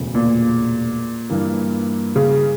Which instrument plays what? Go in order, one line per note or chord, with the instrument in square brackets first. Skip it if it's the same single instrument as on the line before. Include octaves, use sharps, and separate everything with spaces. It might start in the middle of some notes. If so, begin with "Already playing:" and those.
Already playing: [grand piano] E1 D2 C#3 F#3 B3
[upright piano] A#2
[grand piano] G2 E3 A#3
[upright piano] C#3